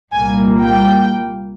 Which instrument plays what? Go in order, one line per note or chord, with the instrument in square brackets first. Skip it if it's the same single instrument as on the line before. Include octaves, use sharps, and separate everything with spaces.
[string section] C2 A#2 G3 A#3 G#5
G5